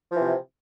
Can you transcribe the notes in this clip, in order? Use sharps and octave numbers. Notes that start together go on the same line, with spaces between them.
C3 E3 F3